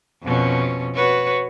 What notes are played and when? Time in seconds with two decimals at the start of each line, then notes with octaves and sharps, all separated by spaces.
0.23 F2 B2 C#4
0.95 F#4 B4 C#5